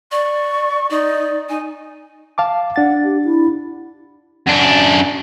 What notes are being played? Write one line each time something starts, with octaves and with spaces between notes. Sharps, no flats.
D5 C#6
D#4 D5
D#4 G#5
F5 A5 D6
D4 F#5 A6
G4
E4
F#2 D4